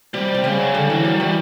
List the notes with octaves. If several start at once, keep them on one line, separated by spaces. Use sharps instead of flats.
C3 G3
C3
C#3 G3
F#3
D3 G3
E3 F#3
F#3 G3
E3 G3